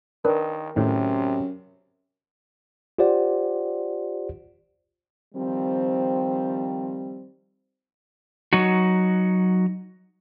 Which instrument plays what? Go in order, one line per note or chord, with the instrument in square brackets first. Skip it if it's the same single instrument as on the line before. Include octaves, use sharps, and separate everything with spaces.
[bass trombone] D#3 [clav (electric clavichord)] D4 B4 [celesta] A#4
[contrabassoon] F#2 [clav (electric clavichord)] A2 D#3 [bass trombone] C3
[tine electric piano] F4 G4 C5 D5 F#5
[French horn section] D#3 F3 G3 C4
[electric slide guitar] F#3 D#4 F#4